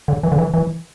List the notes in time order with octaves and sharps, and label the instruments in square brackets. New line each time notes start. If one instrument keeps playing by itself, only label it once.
[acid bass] D3
E3
D3
E3
E3